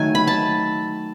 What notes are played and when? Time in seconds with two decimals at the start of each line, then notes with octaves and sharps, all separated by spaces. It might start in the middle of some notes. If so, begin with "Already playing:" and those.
Already playing: D#3 F#3 A3 G#5
0.15 B5
0.27 A5